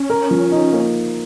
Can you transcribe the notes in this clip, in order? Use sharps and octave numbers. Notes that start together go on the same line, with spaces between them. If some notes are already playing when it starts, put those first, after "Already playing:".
Already playing: C#4
A#4
F3
D#4
A#3